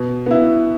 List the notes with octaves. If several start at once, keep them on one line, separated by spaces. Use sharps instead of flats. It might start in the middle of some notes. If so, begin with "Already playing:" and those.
Already playing: B2
B3 E4